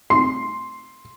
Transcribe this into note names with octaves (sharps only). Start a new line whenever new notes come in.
C6